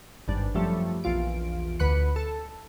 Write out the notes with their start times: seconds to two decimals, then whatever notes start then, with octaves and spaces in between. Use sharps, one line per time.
0.28 G#1 G2 D4
0.54 F#2 F3 G3 A3
1.04 A#1 E2 F4 D7
1.79 D2 B4 B5 F#6 C#7
2.16 A4